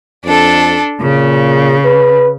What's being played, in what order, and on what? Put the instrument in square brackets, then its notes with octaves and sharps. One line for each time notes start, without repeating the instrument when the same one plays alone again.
[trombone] F2 [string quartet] D4 A4
[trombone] A#2 [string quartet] C#3
[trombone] B4